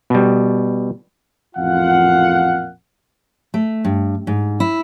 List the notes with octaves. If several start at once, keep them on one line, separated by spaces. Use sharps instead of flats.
B2 G3
A1 F2 A#2 F4 F5 F#5
A3
G2
G#2
E4